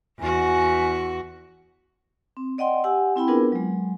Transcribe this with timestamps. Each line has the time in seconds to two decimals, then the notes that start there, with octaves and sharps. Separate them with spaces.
0.20 E2 F#4 G#5
2.37 C4
2.58 D5 D#5 F#5 G5 C6
2.84 G4 F#5 G#5 E6
3.16 C4 E4 G5 B5
3.27 B3 D4 F4 G#4 A#4 B4
3.52 F#3 G#3